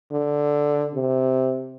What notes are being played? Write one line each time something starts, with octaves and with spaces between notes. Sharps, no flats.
D3
C3